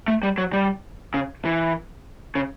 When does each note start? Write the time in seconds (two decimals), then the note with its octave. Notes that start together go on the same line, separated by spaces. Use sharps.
0.08 A3
0.23 G3
0.38 F#3
0.53 G3
1.14 C#3
1.45 E3
2.35 C#3